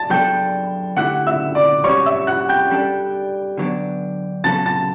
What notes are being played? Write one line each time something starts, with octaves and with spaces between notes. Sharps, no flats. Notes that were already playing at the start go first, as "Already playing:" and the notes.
Already playing: A5 A6
F#3 B3 D4 A4 G5 G6
D3 A3 E4 G4 F#5 F#6
E5 E6
D5 D6
G3 C#4 F#4 C#5 C#6
E5 E6
F#5 F#6
G5 G6
G3 D4 A4
D3 F#3 B3 D4
C#3 F#3 B3 F#4 A4 A5 A6
A5 A6